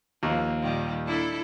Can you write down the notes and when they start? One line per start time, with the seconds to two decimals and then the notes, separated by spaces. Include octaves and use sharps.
0.23 D#2 F3 A#3
0.62 A#2 D#3 G3
1.05 D4 E4 A4